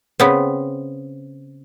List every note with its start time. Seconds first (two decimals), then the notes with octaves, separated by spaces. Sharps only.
0.20 C#3 B3 C4